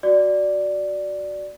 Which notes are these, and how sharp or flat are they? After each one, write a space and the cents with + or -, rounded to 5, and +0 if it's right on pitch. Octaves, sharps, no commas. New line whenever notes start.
F#4 +0 D5 +0